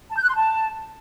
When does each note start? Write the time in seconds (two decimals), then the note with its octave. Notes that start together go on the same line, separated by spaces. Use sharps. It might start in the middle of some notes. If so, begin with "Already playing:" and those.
0.11 A5
0.17 G6
0.23 F#6
0.29 C6
0.35 A5